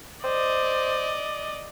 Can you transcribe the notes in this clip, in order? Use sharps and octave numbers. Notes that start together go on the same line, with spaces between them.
C5 D5 D#5